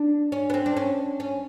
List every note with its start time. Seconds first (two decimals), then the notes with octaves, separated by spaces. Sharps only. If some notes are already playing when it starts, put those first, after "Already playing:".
Already playing: D4
0.32 C#4
0.50 B3
0.54 C4
0.66 D4
0.77 C#4
1.20 C#4